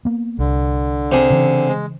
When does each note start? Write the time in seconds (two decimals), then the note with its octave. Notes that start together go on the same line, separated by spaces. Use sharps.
0.05 A#3 B3
0.39 C2 D3
1.12 C3 G#4
1.30 C#3 E3
1.68 G#3